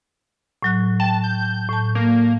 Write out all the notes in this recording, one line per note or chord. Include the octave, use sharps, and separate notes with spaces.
A2 F#3 F#6
G5 A5
G6
A2 A5
A#3